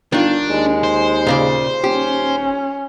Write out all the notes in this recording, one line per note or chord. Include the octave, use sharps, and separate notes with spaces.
G1 D#3 D4 F4
D#2 G#3
C5
A#2 C#3 D5
D#1 C#4 G4